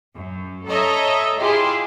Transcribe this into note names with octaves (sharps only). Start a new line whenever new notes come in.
F#2
A4 C#5 D#5 E5 A#5
E4 F4 G4 G#4